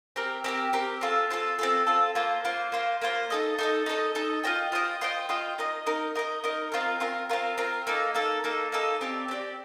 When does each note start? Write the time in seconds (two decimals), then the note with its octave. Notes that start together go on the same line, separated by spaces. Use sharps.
0.16 C4 G4 A#4
0.44 C4 G4 A#4
0.73 C4 G4 A#4
1.01 C4 F4 A4
1.30 C4 F4 A4
1.59 C4 F4 A4
1.87 C4 F4 A4
2.15 A#3 F4 C5
2.45 A#3 F4 C5
2.72 A#3 F4 C5
3.02 A#3 F4 C5
3.30 D#4 A4 D#5
3.59 D#4 A4 D#5
3.86 D#4 A4 D#5
4.15 D#4 A4 D#5
4.43 F4 C5 D#5 G5
4.72 F4 C5 D#5 G5
5.01 F4 C5 D#5 G5
5.29 F4 C5 D#5 G5
5.58 D#4 A#4 D#5
5.86 D#4 A#4 D#5
6.15 D#4 A#4 D#5
6.44 D#4 A#4 D#5
6.72 C4 F4 A#4
7.00 C4 F4 A#4
7.29 C4 F4 A#4
7.58 C4 F4 A#4
7.87 A#3 D#4 A4
8.14 A#3 D#4 A4
8.44 A#3 D#4 A4
8.72 A#3 D#4 A4
9.01 C4 G4 D5
9.28 C4 G4 D5